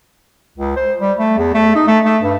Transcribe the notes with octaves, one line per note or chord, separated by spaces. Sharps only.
C#2
C5
G3
A3
E2
A3
D#4
A3
A3
G2